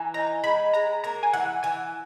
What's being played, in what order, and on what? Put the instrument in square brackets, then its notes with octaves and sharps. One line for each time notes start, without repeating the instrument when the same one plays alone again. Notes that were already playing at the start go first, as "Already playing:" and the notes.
Already playing: [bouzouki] E3 [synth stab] G#5 A#5
[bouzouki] D#4 [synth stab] A#5
[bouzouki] G#3 [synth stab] B5
[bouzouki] G#3 [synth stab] A#5
[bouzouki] A#3 [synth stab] A#5
[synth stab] G#5
[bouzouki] E3 [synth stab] F#5
[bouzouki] E3 [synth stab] G#5